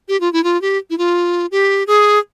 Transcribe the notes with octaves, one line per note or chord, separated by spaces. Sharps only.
G4
F4
E4
F4
G4
E4
F4
G4
G#4